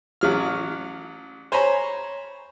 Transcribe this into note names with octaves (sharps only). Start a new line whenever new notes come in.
A1 F#3 F6
C5 C#5 G#5 A#5 B5